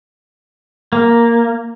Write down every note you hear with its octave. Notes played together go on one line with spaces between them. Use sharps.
A#3